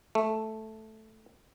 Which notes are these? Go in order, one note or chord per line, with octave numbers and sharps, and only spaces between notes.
A3